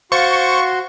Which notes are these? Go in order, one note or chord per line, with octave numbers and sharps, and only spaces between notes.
F#4 C5 F5 C6 C#6 A6